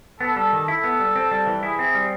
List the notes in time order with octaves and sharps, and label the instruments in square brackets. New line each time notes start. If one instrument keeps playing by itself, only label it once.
[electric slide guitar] B3 [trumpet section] A4
[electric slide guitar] G3
D#3
[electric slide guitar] E4 [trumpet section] A4
[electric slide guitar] B3
G3
C4
G3
E3
[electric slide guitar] E4 [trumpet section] G#4
[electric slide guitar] C4
G3